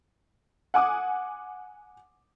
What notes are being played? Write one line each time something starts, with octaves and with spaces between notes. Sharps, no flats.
F#5 G#5 D6 D#6